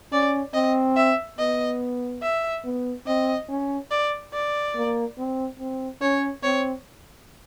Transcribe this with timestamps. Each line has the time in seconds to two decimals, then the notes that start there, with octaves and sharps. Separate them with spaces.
0.12 C#4 D5
0.54 C4 D#5
0.96 E5
1.38 B3 D#5
2.22 E5
2.64 B3
3.06 C4 D#5
3.49 C#4
3.91 D5
4.33 D5
4.76 A#3
5.18 C4
5.59 C4
6.01 C#4 C#5
6.43 C4 C#5